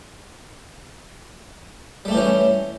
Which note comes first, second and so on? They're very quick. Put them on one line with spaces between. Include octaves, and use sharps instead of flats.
G3 A3 G4 E3 C#4